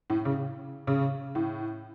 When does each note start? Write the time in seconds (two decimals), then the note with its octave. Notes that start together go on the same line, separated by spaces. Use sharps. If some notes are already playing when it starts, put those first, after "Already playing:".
0.10 A2
0.25 C#3
0.87 C#3
1.35 A2